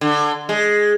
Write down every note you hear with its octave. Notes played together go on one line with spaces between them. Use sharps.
D3
G#3